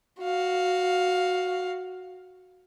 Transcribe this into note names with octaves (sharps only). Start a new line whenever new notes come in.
F#4 F5